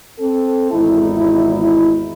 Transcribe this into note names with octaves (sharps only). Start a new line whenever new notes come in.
C4 A4
G#1 E2 D#4 E4